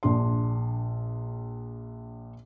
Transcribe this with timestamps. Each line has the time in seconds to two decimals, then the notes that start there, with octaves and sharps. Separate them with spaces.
0.03 A#1 D4 C6